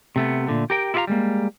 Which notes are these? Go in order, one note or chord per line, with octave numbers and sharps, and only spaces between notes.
C3 A3 B3
A#2 D3 A3
G4 A#4 G5
E4 F4 G4 B4 F5 A#5
G3 G#3 A#3